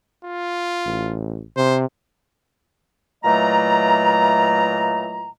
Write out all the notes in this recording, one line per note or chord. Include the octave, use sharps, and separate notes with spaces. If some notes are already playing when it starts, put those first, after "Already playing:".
F4
A1
C3 C5
A#2 E3 F#3 A3 D#5 A#5